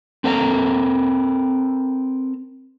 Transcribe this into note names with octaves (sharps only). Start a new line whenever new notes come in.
C4 A4 A#4 E5 A#5